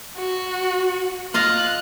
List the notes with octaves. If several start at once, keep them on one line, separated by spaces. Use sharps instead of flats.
F#4
F4 D#5 F5 F#6